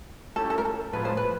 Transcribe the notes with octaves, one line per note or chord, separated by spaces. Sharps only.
A3 C#4 E4 G4 A4
A4
A#4
A4
A2 F3 G#3 B3 B4
C5
B4